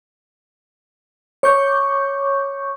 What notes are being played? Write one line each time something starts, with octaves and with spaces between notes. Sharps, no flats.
C#5 C#6 D6 G6